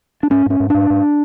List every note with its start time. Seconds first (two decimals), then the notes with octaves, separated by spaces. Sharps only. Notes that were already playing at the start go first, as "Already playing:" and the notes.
0.23 D4
0.30 G#2 C#4
0.46 G#2 C#4
0.60 G#2
0.70 G#2 D4
0.90 G#2